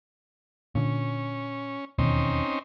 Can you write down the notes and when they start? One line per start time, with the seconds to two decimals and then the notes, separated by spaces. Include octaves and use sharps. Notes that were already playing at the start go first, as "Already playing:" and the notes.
0.75 A#2 D3 C#4
1.98 E1 D#2 B2 C4 C#4 D#4